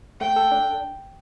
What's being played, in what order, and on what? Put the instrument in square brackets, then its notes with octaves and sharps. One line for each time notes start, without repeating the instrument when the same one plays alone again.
[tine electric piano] A3 [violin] G5
[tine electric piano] A4
D4